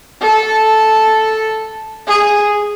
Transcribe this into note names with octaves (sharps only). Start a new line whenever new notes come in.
A4
G#4